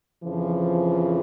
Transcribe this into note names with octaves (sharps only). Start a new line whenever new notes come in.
F2 C#3 E3 F3